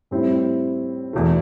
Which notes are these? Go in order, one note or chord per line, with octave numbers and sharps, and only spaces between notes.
A2 G3 C4 E4
E2 B2 A3